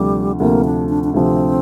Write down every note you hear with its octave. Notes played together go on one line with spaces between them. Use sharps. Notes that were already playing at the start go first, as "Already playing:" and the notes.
Already playing: D2 C3 F3 G3
D2 C3 F3 A#3
D4
D4
D4
D2 C3 F3 C4